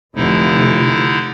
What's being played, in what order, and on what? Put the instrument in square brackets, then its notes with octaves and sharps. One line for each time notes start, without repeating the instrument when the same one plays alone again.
[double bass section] F1 [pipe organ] D3 D#4 E4